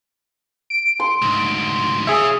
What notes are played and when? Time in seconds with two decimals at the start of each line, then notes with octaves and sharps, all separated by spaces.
0.70 D7
1.00 C6
1.22 D2 G#2
2.07 G#4 C#5 E5 F5